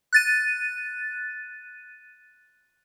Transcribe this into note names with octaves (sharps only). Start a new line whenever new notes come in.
F#6 A6 D#7